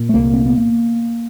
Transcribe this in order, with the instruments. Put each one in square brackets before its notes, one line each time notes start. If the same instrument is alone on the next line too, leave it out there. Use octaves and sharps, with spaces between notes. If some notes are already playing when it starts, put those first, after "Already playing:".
Already playing: [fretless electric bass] A#2
A3
C2 A#3
C4
B3
A#3